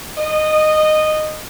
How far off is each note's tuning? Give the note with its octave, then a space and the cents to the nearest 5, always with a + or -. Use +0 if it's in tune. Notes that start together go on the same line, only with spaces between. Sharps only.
D#5 -15